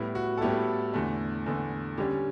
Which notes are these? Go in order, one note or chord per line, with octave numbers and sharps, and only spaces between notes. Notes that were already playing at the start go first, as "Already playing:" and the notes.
Already playing: A2 G3 B3 E4
F#4
A4
A2 G3 B3 E4 G4
E2 D3 A3
E2 D3 A3
D3 G3 C#4 G4